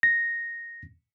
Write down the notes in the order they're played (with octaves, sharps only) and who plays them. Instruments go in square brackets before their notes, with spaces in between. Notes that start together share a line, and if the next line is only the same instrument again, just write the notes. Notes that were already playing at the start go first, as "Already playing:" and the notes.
[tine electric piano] A#6